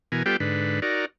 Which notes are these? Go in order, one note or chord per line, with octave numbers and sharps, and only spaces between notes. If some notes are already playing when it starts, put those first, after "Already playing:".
B2 E3 A#4 G#5
G3 B3 F4 G4 A4 G5
G#2 D3 B4
D#4 F#4 A#4 D5